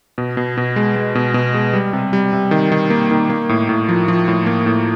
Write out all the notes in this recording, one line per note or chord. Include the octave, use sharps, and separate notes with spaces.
B2
B2
B2
G#3
G#3
B2
B2
G#3
G3
C3
G3
C3
D#3
D#3
A#3
D#3
A#3
A2
A2
F3
F3
A2
A#3
A2